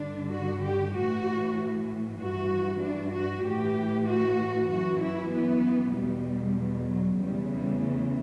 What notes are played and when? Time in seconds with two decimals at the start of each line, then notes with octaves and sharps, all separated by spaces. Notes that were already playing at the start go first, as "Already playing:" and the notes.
Already playing: G2 D3 D4
0.32 F#4
0.64 G4
0.95 A2 E3 F#4
2.20 G2 E3 F#4
2.83 D4
3.13 F#4
3.44 A2 E3 G4
4.07 F#4
4.69 F#2 E3 F#4
5.01 E4
5.32 B3
5.94 E2 B2 G3
6.57 G3
6.88 F#3
7.19 E2 C#3 E3 G3
7.51 G3
7.82 A3